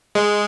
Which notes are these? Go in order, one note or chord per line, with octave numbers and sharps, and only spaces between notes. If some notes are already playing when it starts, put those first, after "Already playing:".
G#3